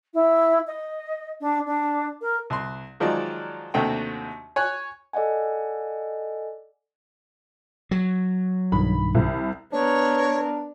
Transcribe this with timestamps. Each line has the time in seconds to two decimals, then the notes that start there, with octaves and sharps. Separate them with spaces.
0.14 E4
0.67 D#5
1.41 D4
1.66 D4
2.21 A#4
2.50 C2 C6
3.00 D#3 F3 F#3 G#3 D5
3.74 D#2 C3 A3 D4 F#4 G5
4.56 C#5 G#5 F#6
5.13 A4 D5 D#5 F#5 G#5
7.91 F#3
8.72 B1 G2 D#3 B5
9.15 C2
9.73 B3 D4 A#4 C#5